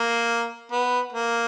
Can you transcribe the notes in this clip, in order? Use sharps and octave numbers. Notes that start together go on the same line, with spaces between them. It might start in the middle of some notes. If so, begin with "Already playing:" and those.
Already playing: A#3
B3
A#3